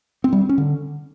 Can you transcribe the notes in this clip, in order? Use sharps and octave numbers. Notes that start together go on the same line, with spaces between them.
C4
G3
C4
C#4
D3